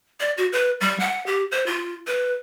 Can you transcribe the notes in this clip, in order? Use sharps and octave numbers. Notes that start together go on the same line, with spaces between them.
D5
F#4
B4
G3
F#5
G4
C5
F4
B4